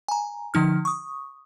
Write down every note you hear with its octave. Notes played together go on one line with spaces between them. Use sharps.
G#5 A#5
D3 F3 D#4 F6
C#6 D#6